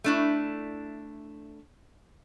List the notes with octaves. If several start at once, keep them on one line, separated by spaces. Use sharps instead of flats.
A3 D4 E4